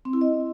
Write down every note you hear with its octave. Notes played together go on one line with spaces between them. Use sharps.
C4
E4
D#5